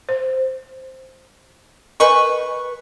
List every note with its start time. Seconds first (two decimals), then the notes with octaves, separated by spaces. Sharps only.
0.09 C5
2.00 A#4 B4 D#5 G#5 C#6